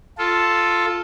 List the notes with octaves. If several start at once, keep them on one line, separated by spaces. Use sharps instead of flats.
F4 A4